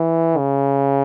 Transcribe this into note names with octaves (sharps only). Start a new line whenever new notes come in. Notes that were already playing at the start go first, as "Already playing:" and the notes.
Already playing: E3
C#3